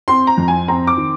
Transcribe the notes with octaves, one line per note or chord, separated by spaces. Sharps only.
C4 C6
A#5
F2
G#5
C4 A#5
D6
D#3